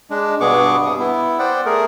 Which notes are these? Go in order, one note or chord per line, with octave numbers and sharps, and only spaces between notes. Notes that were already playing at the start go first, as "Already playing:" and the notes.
G#3 D4
G2 B2 B3 G#4 C#6 D6
C3 D#6
B3 E4
C5 D5 F#5 G5
A3 G#4 A#4